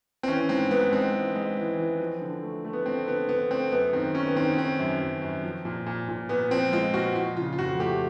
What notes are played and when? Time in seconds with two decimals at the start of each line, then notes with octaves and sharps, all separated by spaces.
0.23 C4
0.28 E3 C#4
0.49 G#2 C4
0.71 G#2 B3
0.92 G#3 C4
1.13 E3
1.35 G#3
1.57 E3
1.79 E3
2.00 F3
2.21 D3
2.43 A3
2.64 A3
2.73 B3
2.86 A3 C4
3.07 D3 B3
3.29 D3 B3
3.50 A3 C4
3.72 F#2 B3
3.93 D#3 C4
4.15 D#3 C#4
4.27 B3
4.36 D#3 C4
4.52 C#4
4.58 D#3 C4
4.79 F#2
5.01 F#2
5.22 F#2
5.43 F3
5.65 A#2
5.87 A#2
6.08 A#2
6.29 A#2 B3
6.51 F3 C4
6.73 G#3 F4
6.94 A#2 F#4
7.15 F3 F4
7.37 C#3 F4
7.53 F4
7.59 F2 F#4
7.79 A3 G4